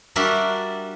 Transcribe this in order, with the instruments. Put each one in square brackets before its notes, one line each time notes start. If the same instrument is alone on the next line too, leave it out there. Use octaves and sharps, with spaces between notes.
[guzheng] G3 D4 F#4 A#4 E5